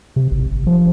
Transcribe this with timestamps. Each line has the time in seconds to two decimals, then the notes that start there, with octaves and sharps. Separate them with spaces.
0.16 C3
0.31 G#1
0.46 G1
0.67 F3